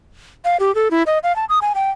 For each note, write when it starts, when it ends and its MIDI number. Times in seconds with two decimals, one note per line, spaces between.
0.45 0.57 77
0.60 0.74 67
0.75 0.88 69
0.91 1.03 64
1.06 1.18 75
1.23 1.35 77
1.36 1.45 81
1.49 1.59 87
1.62 1.73 80
1.75 1.90 79